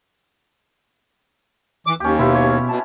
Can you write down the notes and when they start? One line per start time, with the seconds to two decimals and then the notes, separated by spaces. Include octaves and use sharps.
1.87 E3 D6
2.00 D#2 C#4 G4
2.19 B2 E4 F4
2.35 C#5
2.69 B2 A5